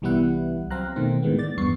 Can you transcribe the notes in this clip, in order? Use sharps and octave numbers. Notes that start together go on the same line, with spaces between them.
C2 E3 G3 B3 E4 F#5
F#3 C4 F5 A#5 F#6
B2 D#3 A3 C4
A2 D#3 G#3 B3
D5 A6
E2 G2 B3 C#6 C7 C#7